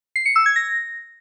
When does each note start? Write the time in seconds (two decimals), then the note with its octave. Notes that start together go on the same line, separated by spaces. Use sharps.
0.16 C7
0.26 C#7
0.36 E6
0.46 G#6
0.56 A#6